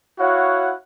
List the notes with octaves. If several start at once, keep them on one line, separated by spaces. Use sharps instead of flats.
E4 F#4 C#5 F5 F#5